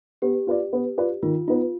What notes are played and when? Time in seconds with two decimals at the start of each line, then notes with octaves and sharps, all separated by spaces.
0.22 B3 G4
0.47 F4 B4 D5
0.73 B3
0.98 F4 B4 D5
1.23 D#3 F4
1.48 B3 D#4 F4